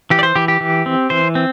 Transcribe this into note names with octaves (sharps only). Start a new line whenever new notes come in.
E3 G4
D5
C5
E3 G4
G4
E3
C4
E3 C5
C4